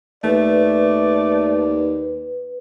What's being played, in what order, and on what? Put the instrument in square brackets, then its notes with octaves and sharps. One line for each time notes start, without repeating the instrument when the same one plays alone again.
[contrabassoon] D#2 [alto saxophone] A3 [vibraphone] B4 [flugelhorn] D5